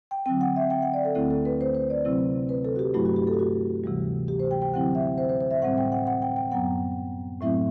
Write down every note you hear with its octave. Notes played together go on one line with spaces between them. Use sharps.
G5
D3 F#3 C4 G5
F#5
E5
G5
F#5
D5
A4
D2 D3 A3 C4 E4 A4
A4
B4
C5
C5
D5
C3 F#3 C4 E4
B4
A4
F#4
G4
G2 F#3 A3 E4 F#4
F#4
G4
A4
G4
F#4
D2 C3 E3 G3
G4
C5
G5
G5
D3 F#3 C4 E4 F#5
E5
C5
C5
C5
E5
A2 G3 C4 F#5
G5
F#5
F#5
G5
G5
F#2 F#3 B3 F#5
A2 F#3 A3 C4 E4 E5